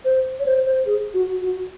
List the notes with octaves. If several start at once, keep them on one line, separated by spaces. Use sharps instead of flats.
C5
C#5
C5
C5
G#4
F#4
F#4